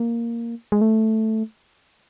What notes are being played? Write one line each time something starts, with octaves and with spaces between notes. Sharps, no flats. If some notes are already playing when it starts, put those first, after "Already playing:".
Already playing: A#3
G#3
A3